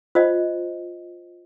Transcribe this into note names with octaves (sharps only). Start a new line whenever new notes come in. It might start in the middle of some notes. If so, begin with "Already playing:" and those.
F4 C5 D#5